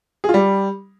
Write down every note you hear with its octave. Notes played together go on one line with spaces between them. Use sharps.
G#4
F4
G3